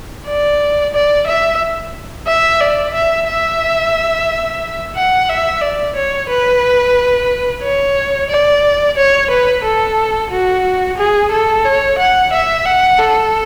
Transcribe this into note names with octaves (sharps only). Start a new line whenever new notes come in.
D5
D5
E5
E5
D5
E5
E5
F#5
E5
D5
C#5
B4
C#5
D5
C#5
B4
A4
F#4
G#4
A4
C#5
F#5
E5
F#5
A4